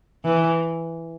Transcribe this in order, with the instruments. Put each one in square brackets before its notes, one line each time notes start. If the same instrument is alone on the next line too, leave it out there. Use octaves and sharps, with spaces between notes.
[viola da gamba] E3